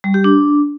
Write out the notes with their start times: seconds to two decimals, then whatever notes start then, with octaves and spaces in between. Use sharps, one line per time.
0.04 G3
0.14 G4
0.24 D4